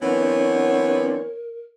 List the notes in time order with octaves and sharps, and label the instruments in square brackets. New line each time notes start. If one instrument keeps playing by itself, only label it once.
[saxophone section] E3 F#3 B3 [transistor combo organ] C4 D4 [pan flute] A#4 [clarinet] C#5